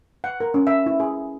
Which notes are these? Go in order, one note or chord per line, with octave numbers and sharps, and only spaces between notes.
F#5
A#4
C#4
E5
E4
G#4